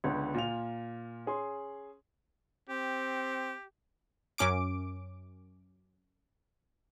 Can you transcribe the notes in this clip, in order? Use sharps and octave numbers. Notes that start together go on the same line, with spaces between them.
C#2 D3 B3
A#2 F4 F7
C#4 G#4 C6
C4 G4
F#2 C#4 D6 D7